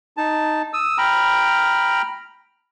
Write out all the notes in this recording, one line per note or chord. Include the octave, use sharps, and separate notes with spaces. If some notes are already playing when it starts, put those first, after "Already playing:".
D#4 A5
D#6 E6
G5 A#5 B5 F6